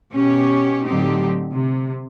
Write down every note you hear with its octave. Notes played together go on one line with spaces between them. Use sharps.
B2 C#4 G4 C#5
A2 D3 F#3 C4 D#4 G4
C3